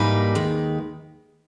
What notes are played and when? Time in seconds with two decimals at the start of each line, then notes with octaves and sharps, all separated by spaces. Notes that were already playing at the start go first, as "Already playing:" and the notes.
Already playing: G#2 E3 G3 A#3 D#4 B4
0.35 D#2 D#3 G#3